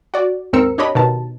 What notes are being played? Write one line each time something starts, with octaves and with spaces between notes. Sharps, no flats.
F#4 D5
D#2 G#2 C4 A#4 E6 C#7
D4 G4 C#5 D#5 B5
B2 D#3 A5